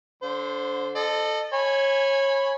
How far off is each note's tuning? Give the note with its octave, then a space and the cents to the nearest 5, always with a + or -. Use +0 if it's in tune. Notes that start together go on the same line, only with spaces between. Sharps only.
D3 -25 C5 +0 C6 -40
A4 +0 D#5 -35
C#5 -20 G#5 +0 B5 +0